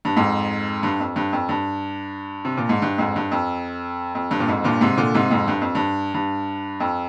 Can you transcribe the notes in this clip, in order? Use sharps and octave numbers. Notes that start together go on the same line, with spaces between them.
G2
F2 G#2
G2
F2
G2
F2
G2
C3
A#2
G#2
G2
F2 G#2
G2
F2
F2
G2
A#2
F2 G#2
G2 A#2
G#2 C3
A#2 D3
G#2 C3
F2 G#2
G2
F2
G2
G2
F2